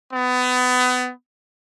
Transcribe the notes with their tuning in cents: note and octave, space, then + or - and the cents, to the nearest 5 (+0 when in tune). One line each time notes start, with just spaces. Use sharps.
B3 +25